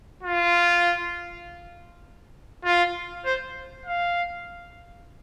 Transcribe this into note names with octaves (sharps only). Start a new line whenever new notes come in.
F4
F4
C5
F5